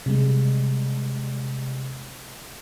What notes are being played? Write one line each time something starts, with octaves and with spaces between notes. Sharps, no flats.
C3 G3 G#3